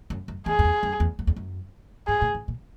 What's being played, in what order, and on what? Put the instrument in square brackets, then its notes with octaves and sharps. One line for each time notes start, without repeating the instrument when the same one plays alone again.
[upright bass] F#2
F#2
[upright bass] E2 [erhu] G#4
[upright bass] F#2
E2
F#2
E2
F#2
E2
F#2
[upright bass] G#2 [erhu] G#4
[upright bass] A#2
G#2
A#2